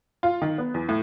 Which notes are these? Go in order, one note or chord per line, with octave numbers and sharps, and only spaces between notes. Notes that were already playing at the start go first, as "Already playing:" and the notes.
F4
D#3
B3
E2
A2